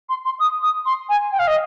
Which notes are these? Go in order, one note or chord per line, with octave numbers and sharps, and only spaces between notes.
C6
C6
D#6
D#6
C6
G#5
G5
F5
D#5